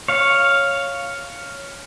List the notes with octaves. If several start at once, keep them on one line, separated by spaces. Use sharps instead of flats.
C#5 F5